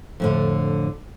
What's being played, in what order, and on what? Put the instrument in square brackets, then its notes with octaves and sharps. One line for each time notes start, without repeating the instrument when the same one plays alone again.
[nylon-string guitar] F2 A2 D3